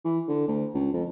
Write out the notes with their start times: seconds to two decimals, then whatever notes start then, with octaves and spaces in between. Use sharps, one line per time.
0.04 E3
0.28 D3
0.48 D2
0.74 C#2
0.93 F2